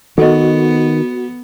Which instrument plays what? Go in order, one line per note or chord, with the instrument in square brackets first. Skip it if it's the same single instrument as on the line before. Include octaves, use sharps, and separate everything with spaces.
[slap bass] D#3 [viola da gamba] B3 [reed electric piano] F#4 [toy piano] A4 D#5